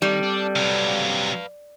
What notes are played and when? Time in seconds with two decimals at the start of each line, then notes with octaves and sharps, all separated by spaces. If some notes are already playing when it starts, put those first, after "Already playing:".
0.02 D#3 G3 C4 A4 D5
0.23 D4
0.56 C3 F#3 B4 F5